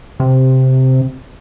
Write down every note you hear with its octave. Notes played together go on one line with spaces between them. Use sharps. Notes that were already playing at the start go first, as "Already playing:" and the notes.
C3